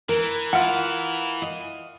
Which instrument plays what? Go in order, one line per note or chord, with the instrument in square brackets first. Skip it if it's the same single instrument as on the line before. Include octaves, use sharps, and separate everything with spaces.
[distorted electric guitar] E3 [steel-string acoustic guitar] A#4
[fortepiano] F4 F#5 [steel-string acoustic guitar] A#4
[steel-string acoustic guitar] D#5